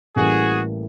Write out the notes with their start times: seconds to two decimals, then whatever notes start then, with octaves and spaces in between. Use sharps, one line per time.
0.16 A1 A2 E3 G3 A#3 F#4 G#4